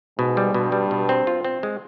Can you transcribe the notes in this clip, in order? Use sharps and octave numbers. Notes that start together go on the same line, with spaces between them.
G#2 B2
G3
G2 B2
G3
B2
C4
F4
C4
G#3